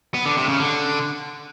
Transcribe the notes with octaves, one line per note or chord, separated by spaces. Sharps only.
B3
D3
C3
C#3
D3